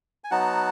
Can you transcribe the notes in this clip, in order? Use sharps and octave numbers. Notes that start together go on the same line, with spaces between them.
G#5
F#3 B3 D#4 F#4 F#5 A5